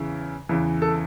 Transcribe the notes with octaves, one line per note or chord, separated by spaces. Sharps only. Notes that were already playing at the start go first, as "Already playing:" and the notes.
Already playing: E2 C#3 E3
E2 C#3 E3
A4